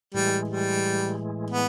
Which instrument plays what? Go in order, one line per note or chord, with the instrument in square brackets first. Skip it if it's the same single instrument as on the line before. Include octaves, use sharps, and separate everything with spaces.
[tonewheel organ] A2 E3 G#3 [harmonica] G3
[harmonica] G3
B3